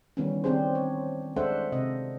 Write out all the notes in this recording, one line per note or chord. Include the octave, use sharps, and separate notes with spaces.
D#3 E3 G3 B3 C#4
D#3 C4 D4 G4 G#4 C5
C#5
G#3 D4 A4 C5 E5 F#5
C3 D#5